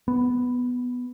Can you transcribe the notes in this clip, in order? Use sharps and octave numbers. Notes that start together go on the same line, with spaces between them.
B3